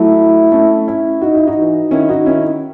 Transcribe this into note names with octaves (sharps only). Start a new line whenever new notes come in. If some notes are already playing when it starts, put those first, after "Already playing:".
Already playing: F#3 A3 E4
A3 C#4
C#4 E4
D#4 F#4
E4
D#4 F#4
E3
D#3 C#4 E4
D#4 F#4
D#3 C#4 E4